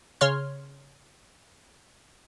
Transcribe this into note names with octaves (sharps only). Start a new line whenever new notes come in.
C#3 C#5 C6 F6